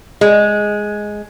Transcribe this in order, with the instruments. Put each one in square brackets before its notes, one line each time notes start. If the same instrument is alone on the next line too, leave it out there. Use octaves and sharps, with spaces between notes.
[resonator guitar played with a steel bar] G#3